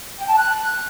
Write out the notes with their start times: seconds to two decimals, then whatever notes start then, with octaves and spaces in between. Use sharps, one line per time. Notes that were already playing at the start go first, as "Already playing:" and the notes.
0.19 G5
0.28 A5
0.37 F#6